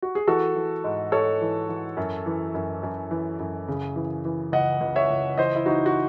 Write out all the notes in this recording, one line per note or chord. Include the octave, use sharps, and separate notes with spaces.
F#4
G#4
E3 F#4 A4
E3
G#2
G#2 A4 C#5
E3
E3
F#2
E3
F#2
F#2
E3
F#2
C#3
E3
E3
C#2 D#5 F#5
C#2
C#5 E5
C#2
E3 C5 D#5
E4
E3 D#4 F#4
F#4